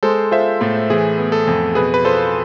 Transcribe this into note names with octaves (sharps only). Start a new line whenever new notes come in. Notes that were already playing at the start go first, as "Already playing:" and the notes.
G#3 A4 C5
F4 C5 E5
A2 A4
E3 G#4
B3
A4
F2
B2 G#4 B4
B4
F4 A4 C5